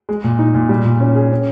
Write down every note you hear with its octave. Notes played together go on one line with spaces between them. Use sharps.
G#3
A#2
D#4
A#2
G3
A#2
C#4
G#4
C#4